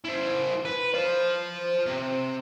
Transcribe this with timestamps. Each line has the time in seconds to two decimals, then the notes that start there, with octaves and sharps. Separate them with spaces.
0.05 E4 C5
0.65 B4
0.94 C5 F5
1.86 C3